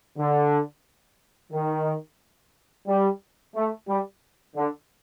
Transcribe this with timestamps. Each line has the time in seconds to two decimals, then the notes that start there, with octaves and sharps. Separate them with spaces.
0.18 D3
1.52 D#3
2.87 G3
3.55 A3
3.88 G3
4.56 D3